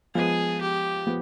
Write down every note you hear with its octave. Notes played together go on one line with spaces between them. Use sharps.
F3 G#3 B3 G#4
G4
F3 B3